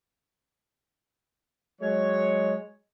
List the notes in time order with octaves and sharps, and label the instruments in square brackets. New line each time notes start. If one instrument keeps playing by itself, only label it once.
[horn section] F#3 G#3 C#5